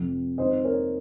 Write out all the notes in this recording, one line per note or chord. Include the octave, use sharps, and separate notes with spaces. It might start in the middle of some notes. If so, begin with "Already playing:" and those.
Already playing: F1 F2 C3 F3
F2 D#3 G#3 C#4 C5 D#5
A#4 C#5